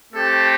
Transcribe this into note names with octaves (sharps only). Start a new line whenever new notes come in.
A3 C4 G4 A4